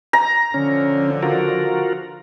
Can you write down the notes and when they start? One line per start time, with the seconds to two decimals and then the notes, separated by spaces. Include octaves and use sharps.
0.13 A#5
0.54 D3 F3 C#4
1.23 F4 F#4 A#4